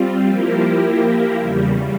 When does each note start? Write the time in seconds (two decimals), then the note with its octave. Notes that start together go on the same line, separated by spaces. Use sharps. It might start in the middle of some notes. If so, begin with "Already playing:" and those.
Already playing: G3 C4 F4
0.26 F3 A#3 E4 G4 A#4
1.38 E2 C#3 G3